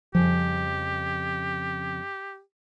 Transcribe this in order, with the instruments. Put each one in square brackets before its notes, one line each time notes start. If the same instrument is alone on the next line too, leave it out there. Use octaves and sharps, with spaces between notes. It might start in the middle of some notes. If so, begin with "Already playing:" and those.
[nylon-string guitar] F2 C#3 G3 [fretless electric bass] F3 [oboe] G4